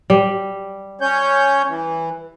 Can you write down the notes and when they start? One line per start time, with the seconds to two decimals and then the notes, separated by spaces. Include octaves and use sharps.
0.10 G3
1.01 C#4 C#5 G6
1.68 E3